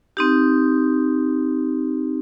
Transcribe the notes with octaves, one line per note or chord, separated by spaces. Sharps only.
C4 D#4 G4